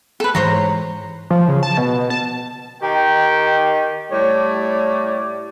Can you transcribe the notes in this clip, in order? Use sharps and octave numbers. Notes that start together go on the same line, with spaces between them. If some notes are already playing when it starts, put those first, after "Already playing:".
A4 B4
G#2 E3 C5 C#5 A#5
F3
C#3
A5
B2
A5
D#3 D#4 G4 G5
A2 G3 C#5 D5